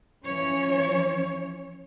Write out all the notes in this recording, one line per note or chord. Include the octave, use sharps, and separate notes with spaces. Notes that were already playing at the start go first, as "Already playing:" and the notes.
E3 F3 C#4 C#5